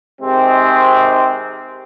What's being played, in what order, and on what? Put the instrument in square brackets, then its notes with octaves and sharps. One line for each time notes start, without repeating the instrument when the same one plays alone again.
[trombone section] C3 D#3 G#3 C4